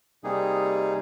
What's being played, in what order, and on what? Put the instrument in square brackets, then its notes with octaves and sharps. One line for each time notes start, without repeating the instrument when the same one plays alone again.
[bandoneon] C3 G3 A#3 D#4 G#4